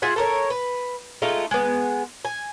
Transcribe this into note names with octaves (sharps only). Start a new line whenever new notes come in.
F4 G#4 E5 F#5
A4 A#4 C#5
B4
G#3 A3 D#4 F4
G#3 B3
G#5